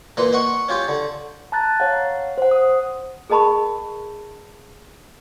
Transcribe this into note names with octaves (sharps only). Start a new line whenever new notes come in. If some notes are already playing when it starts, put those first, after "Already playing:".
A#2 E3 B4 C6
D#5 F#5 C#6
C#4 F4 G4
D3
A5 A#5 F#6 A6
C#5 F5 F#5
C5 F#5
D#6
G#4 A#4 D#5 A5 B5 C#6